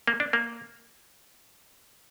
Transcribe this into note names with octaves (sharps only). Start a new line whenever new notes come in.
A#3
D4
A#3